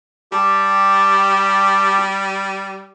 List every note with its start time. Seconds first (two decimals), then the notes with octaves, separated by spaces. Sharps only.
0.32 G3 G4 A5